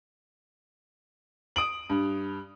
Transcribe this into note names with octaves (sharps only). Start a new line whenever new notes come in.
D#6 D7 F#7
G2